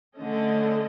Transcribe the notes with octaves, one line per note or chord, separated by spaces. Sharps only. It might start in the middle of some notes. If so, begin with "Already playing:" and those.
D3 A3 C#4 D#5